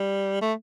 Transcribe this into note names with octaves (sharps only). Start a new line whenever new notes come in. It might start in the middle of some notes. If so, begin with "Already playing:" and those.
Already playing: G3
A3